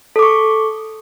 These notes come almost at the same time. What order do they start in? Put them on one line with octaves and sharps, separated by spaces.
A4 D6 C#6